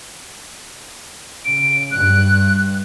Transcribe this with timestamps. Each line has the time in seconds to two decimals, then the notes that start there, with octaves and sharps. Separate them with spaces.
1.45 C#3 D7
1.91 G2 F#6